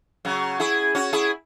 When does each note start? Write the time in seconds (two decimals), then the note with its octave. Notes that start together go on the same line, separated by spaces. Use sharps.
0.25 C#3 F#3
0.60 E4 G#4
0.95 C#4 F#4
1.13 E4 G#4